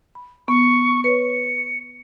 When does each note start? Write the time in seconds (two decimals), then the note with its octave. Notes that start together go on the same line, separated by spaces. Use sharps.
0.15 B5
0.48 B3 C#6
1.04 B4 C#5 C#7